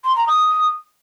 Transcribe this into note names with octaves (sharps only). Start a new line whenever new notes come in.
C6
A#5
D#6